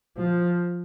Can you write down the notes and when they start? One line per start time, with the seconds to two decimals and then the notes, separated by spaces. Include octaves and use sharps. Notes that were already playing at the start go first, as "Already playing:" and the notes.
0.17 F3